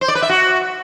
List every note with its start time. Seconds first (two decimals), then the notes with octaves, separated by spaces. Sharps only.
0.01 C5
0.08 D5
0.15 B4
0.22 E5
0.29 F#4